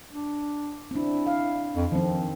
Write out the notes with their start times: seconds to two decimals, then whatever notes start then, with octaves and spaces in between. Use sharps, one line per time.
0.11 D4
0.91 C4 D4 E4
1.27 F5
1.76 F2
1.92 D#3 F3 C4